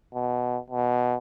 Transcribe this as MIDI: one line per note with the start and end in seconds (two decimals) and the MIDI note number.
0.14 0.57 47
0.70 1.17 47